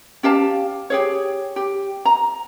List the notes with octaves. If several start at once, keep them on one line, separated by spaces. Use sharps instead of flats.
C#4 G4 F5 A5
G4 G#4 C#5
G4
A#5